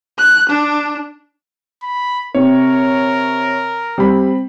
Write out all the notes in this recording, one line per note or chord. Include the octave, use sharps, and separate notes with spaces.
F#6
D4
B5
C3 A#4 C#5
G3 C4 B5